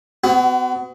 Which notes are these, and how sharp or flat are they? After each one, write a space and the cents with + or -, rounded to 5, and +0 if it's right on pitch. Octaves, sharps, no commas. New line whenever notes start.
B3 +45 F#4 +20